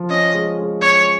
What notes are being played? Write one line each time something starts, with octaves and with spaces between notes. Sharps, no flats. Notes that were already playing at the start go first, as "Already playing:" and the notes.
Already playing: F3
C#4 D#5
G#3
G#3
C#4 C#5